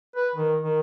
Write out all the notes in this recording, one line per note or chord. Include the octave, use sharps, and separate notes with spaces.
B4
D#3
D#3